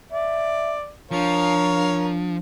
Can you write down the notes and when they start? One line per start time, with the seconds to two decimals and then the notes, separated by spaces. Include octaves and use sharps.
0.11 D5 E5
1.11 F3 D4 A#4 C#5 F5